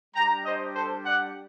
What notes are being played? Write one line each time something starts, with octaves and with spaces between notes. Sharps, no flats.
G3 D4 G4 G5 A#5
C5 D#5
A4 C5
D5 F#5